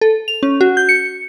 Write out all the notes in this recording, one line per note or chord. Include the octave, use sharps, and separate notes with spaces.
A4
F7
C#4
F#4
G6
C#7